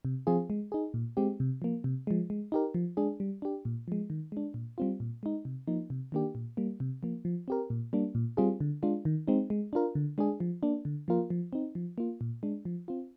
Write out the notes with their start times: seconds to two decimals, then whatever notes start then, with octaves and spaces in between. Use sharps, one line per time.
0.05 C3
0.27 F3 C4 F4 G#4
0.50 G#3
0.72 D#4 G#4
0.94 A#2
1.17 G#3 C4 G4
1.40 C3
1.62 F3 A#3
1.84 C3
2.07 F3 G#3
2.30 G#3
2.52 D#4 G4 A#4
2.74 F3
2.97 G#3 D4 G#4
3.20 G3
3.42 D4 G4
3.65 A#2
3.88 F3 G#3
4.10 D#3
4.32 G#3 D4
4.54 A#2
4.78 G3 C4 F4
5.00 A#2
5.23 G#3 D#4
5.45 C3
5.67 F3 A#3 D#4
5.90 C3
6.12 D#3 A#3 D4 G4
6.35 A#2
6.57 G3 A#3
6.80 C3
7.03 F3 A#3
7.25 F3
7.48 C4 G4 A#4
7.70 A#2
7.93 G3 A#3 D4
8.15 A#2
8.37 G3 C4 F4 G#4
8.60 D3
8.83 G#3 D4 F4
9.05 D#3
9.27 G#3 C4 D#4
9.50 G#3
9.73 D4 F4 A#4
9.95 D3
10.18 G#3 D4 G#4
10.40 F3
10.63 A#3 D4
10.85 D3
11.08 F3 A#3 F4 A#4
11.30 F3
11.53 C4 D#4
11.75 F3
11.98 A#3 F4
12.21 A#2
12.43 G#3 D4
12.65 F3
12.88 C4 F4